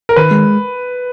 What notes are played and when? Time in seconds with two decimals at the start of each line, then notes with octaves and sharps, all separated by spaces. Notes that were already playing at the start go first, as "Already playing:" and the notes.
0.09 A#4
0.16 D#3 B4
0.31 G#3